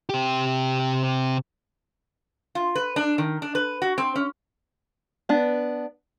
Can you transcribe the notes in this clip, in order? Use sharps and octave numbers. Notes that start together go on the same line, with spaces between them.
C3 G4
F4
B4
D4
D#3
D4
B4
F#4
C4
C#4
B3 D4